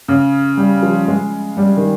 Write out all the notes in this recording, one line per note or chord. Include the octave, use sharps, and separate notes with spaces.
C#3
G3
F3
G#3
G3
D#3